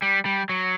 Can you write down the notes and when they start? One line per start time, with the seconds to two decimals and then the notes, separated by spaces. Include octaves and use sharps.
0.02 G3
0.25 G3
0.49 F#3